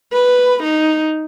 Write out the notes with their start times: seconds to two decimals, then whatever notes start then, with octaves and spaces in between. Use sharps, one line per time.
0.12 B4
0.63 D#4